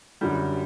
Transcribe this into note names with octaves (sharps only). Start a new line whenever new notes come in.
F#2 D3 G3